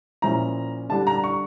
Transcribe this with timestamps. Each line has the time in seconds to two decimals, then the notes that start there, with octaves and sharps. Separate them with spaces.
0.22 A#2 F3 C#4 E4 A#5
0.90 D3 G3 D4 A5
1.07 A#5
1.24 C#6